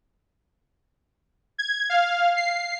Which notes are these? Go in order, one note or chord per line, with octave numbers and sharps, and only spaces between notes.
G#6
F5
C7